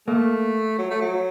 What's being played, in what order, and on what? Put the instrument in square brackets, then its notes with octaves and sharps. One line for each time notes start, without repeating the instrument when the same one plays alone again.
[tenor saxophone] A3 [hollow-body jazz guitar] A#3
[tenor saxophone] F#3
A3
F#3